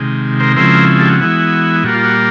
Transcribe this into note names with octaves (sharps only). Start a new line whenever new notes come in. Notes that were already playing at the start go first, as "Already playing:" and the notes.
Already playing: C3 D#3 G#3
A#4 C5
C#3 F3 G#3 C4 E4 A#4 C5
G4 A4
F#4
E3 G#3 B3 E4
A#2 G3 A#3 F#4
F4
F#4